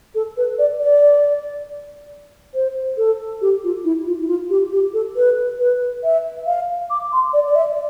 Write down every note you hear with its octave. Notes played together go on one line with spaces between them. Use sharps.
A4
B4
D5
D5
C5
A4
G4
F4
E4
F4
E4
F4
G4
G4
A4
B4
B4
E5
F5
D6
C6
D5
D5
E5
D5